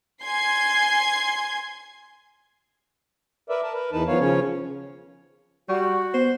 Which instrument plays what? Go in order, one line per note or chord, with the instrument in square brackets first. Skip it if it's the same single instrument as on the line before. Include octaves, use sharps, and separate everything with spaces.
[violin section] G#5 C6 G#6 C7
[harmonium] A#4 B4 D5 E5
A#4 A5
A#4 B4
E2 E3 D#4 B4 A5
D#3 F3 B3 C#5 F5
C#3 F3 C#4 C#5
[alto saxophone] G3 [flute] F#4 [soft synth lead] C#6
[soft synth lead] B3 [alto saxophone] C5